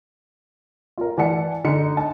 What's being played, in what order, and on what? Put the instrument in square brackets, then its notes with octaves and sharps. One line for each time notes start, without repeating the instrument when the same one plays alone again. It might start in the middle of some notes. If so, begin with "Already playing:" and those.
[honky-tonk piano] F4 A#4
E3 D5 F#5 A5 C#7
D3 D#4 C#7
A5